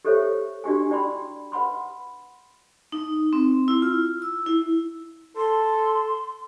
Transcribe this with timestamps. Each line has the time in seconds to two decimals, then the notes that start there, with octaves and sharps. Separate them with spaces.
0.05 G4 A4 C5 C#5 E5
0.64 D4 F#4 G4 G#5
0.90 E4 D5 G5 B5 C6
1.52 B4 F#5 B5 C6
2.92 D#4
3.33 C4
3.68 E4
3.82 F4
4.22 E6
4.46 E4
5.37 A4 C6